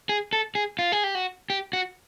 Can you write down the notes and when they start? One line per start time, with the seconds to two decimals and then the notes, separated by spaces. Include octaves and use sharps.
0.09 G#4
0.33 A4
0.55 G#4
0.79 F4
0.92 G#4
1.04 G4
1.15 F#4
1.50 G4
1.73 F#4